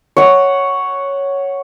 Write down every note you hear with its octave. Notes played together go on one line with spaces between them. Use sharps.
C#5 F#5